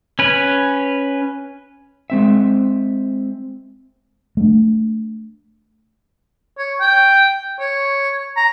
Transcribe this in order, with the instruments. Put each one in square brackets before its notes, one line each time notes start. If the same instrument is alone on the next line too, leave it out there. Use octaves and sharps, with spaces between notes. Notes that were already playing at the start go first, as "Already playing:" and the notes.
[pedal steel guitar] C#4 B4
[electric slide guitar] G#3 C4 E5
[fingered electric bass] A3 D4
[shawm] C#5
G5
C#5
A#5